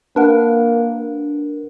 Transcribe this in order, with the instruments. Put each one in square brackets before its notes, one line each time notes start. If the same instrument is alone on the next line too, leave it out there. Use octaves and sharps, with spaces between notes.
[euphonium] A#3 [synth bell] D4 A#4 [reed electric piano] B4 F#5